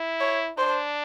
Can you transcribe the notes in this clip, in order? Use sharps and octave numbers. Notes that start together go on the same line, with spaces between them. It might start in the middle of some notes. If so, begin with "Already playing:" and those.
Already playing: E4
C#5
D4 C5